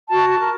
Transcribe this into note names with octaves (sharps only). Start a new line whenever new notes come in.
F#4 A5
A5
A#4